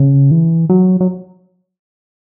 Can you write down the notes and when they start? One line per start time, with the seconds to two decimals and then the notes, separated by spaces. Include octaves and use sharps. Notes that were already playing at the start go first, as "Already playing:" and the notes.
Already playing: C#3
0.31 E3
0.69 F#3
1.01 F#3